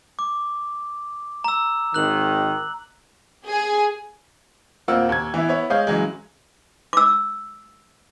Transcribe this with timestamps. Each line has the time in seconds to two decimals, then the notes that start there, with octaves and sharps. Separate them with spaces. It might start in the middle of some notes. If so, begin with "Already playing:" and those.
0.19 D6
1.44 A#5 E6
1.94 G#1 D#3 F#6 F#7
3.47 G#4
4.88 D#1 A#3 C4 F4 F#5 E6
5.09 D#2 G#6
5.34 E3 B3 E4
5.49 B3 E4 C#5
5.70 G#3 C#5 D#5 F5 G6
5.87 C#3 E3 F#3 G#3
6.93 D6 E6